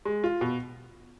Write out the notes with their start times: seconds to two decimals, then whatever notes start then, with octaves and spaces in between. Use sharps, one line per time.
0.05 G#3
0.24 F4
0.41 B2